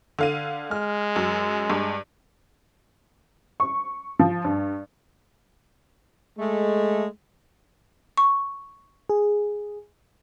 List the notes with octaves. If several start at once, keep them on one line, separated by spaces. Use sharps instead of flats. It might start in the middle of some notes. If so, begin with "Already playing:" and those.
D3 F5 D#7
G#3 F6
F#2
G2
C#6
F3
G2
G#3 A3
C#6
G#4